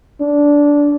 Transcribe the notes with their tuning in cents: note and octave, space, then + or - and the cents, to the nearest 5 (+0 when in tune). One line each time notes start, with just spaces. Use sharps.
D4 -15